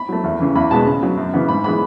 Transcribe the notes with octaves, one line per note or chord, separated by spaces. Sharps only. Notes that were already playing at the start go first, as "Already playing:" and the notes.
Already playing: B5
F#3 A3
E2
C#3 E3
E2 B5
B2 G#3 B3 A5
C#3
F#3 B3
F#2
C#3 E3 B3
G#2 B5
E3 G#3 B3 B5